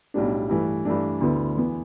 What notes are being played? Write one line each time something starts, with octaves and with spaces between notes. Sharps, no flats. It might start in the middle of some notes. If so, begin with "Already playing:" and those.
B1 A2 G3 D4
G2 E3 A3
G2 E3 A3 D4
D2 D3 B3 E4
E2 E3 B3